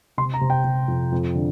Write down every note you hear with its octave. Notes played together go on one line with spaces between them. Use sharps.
C3 C6
A#5
C3
G5
C3
F2
F2
D3